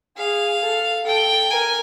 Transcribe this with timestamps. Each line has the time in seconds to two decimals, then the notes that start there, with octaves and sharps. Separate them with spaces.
0.17 G#4 F5
0.62 A4
1.06 A4 G5
1.50 A#4 G#5